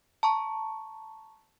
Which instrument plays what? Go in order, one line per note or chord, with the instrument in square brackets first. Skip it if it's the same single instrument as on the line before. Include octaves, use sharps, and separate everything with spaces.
[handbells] A5 A#5 C#6